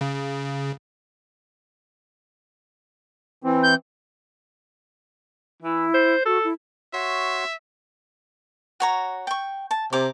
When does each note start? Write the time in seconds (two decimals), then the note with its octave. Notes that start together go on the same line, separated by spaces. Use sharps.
0.01 C#3
3.44 E3 C4
3.63 G6
5.62 E3 E4
5.94 C5
6.26 F#4 A4
6.44 E4
6.93 F#4 C#5 E5 C6
8.80 F#4 C#5 A#5
9.27 G5 C#6
9.71 A5
9.93 C3 A#5 D6